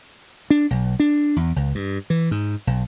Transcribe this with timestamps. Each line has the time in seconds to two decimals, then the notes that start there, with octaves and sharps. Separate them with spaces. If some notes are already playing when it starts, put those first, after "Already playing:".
0.50 D4
0.71 B1
1.00 D4
1.36 E2
1.56 C#2
1.75 G2
2.10 E3
2.31 G#2
2.67 B1